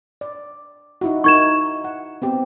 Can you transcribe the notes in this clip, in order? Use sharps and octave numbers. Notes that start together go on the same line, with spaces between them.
D5
D#4 E4 F#4
D#4 E4 A#4 C#6 G#6 E7
F#5
B3 C4 G4